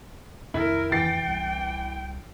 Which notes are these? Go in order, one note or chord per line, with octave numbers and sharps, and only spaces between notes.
F2 C3 D#3 E4 A#4
E3 G5 A6 C7
C2 G3